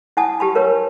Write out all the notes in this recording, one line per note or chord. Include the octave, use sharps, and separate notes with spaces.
E4 F#5 G#5 A5 D#6
G4 A5 B5
A#4 B4 C#5